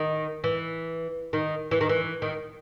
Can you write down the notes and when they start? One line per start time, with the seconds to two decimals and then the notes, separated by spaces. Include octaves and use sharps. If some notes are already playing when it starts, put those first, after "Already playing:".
Already playing: D#3
0.44 E3
1.33 D#3
1.71 E3
1.81 D#3
1.89 E3
2.22 D#3